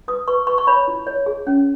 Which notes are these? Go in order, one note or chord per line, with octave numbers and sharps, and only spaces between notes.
B4 D#6
B4 C#6
B4 C#6
C#6
C#5 B5
E4
C#5
G#4
C#4